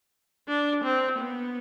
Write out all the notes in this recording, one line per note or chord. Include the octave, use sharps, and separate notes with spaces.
D4
C4
B3